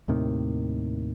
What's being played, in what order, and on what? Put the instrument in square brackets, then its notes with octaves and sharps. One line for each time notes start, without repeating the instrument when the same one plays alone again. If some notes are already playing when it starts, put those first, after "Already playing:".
[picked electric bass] D#2 A2 C3 D#3